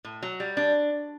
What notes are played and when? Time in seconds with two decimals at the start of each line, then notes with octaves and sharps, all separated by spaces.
0.05 A2
0.23 F#3
0.40 G3
0.57 D4